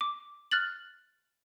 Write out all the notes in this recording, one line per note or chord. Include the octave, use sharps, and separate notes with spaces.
D6
F6 F#6 A6 F#7